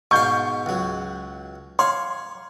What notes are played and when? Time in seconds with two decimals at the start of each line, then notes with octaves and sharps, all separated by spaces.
0.11 G#2 B2 F5 C#6 G6
0.66 C#2 F#3
1.79 C#5 F5 C6